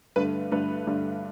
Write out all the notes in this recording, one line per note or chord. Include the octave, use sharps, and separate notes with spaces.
G2 D3 A3 B4
G2 D3 A3 B4
G2 D3 A3